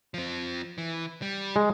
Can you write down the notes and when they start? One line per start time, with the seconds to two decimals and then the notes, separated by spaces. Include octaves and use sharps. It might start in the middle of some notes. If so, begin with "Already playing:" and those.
0.14 F3 C4
0.78 E3
1.22 G3
1.56 G#3